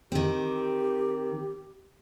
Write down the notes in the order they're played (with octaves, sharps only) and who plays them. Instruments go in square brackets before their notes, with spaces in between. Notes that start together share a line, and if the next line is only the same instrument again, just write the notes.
[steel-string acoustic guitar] D#3 C4 [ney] G4